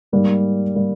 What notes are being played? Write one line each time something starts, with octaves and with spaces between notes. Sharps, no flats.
G#2 G3 A#3
G3 A#3